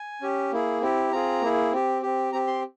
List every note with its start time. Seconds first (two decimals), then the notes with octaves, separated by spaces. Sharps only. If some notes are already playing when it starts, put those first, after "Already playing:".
Already playing: G#5
0.21 C#4 G4
0.52 A#3 E4 G#4
0.81 C4 E4 G4
1.12 C4 F4 G#4 A#5
1.41 A#3 E4 G#4
1.73 C4 G4
2.02 C4 G4
2.33 C4 G4 A#5
2.47 C6